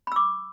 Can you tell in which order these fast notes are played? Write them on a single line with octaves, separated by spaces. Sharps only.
B5 E6 D6